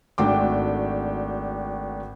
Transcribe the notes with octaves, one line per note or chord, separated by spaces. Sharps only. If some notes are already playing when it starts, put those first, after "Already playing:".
G#1 A3 D4 F#4 G5 D6